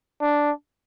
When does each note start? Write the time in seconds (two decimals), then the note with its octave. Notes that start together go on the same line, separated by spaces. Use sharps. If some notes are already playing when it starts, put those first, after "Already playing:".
0.21 D4